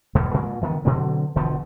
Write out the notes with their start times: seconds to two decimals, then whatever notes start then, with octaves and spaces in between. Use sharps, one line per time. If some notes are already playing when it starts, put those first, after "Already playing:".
0.15 E1 B2 G3 G#3
0.34 G2 A#2 G#3
0.61 D3 D#3 A#3 B3
0.85 B2 D3 F#3 C4
1.35 E1 B2 D3 F3